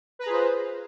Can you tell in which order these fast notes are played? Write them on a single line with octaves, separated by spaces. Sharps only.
B4 A#5 G#4 F4 C5